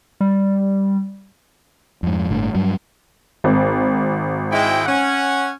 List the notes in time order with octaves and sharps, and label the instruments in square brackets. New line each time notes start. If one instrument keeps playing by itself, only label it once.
[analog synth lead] G3
[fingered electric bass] F2 G#2
G1 A2 D3
G2 F#3
[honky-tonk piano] G#1
[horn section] G#3 E4 G5
C#4 F#5